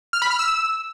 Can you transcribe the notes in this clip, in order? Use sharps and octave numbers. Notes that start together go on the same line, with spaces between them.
F6
B5
F6
E6